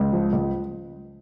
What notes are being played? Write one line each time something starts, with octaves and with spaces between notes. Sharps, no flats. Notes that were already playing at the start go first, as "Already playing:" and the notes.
Already playing: C#2
F3
C#2